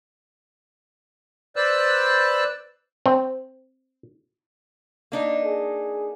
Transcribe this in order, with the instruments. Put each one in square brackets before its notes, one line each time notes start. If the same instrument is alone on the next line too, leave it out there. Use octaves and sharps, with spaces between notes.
[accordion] B4 C5 D5 E6 F#6
[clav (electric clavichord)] C4
[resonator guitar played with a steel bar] A#3 D4 D#4
[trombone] G#4